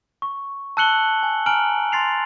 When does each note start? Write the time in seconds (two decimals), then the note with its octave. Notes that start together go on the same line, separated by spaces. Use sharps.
0.22 C#6
0.77 A5 E6 F#6 C#7 F#7 G7
1.23 G#5
1.46 G#5 A#5 F6 D7 F#7
1.92 C6 A6 C7 F7